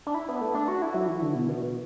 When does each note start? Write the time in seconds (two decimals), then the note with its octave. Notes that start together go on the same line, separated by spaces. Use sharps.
0.07 D4
0.15 E4
0.29 B3
0.41 A3
0.54 D4
0.68 F#4
0.82 E4
0.94 F#3
1.08 E3
1.22 D3
1.35 B2
1.48 B2